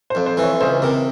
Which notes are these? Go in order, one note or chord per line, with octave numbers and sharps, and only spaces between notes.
C5
F2
C5
E3
C#5
C#2 C5
C3 A#4